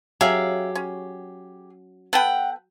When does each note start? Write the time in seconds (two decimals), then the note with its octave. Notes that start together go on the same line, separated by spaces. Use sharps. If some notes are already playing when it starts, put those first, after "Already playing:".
0.21 F#3 C#4 G4 G#4 E5 F5
0.75 C#4
2.13 B3 A4 B4 F#5 G5